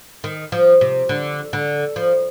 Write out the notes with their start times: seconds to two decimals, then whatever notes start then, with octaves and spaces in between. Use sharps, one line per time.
0.24 D#3
0.52 F3
0.81 C3
1.09 D3
1.53 D3
1.96 F3